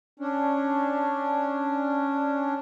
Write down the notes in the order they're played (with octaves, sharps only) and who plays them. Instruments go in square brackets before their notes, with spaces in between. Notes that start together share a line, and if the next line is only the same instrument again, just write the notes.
[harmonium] C#4 D4